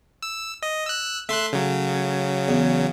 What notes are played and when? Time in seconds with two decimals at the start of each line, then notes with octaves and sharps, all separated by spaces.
0.23 E6
0.63 D#5
0.86 E6 F#6
1.29 A3 E5 C6 F#6
1.53 C#3 F#3
2.48 E2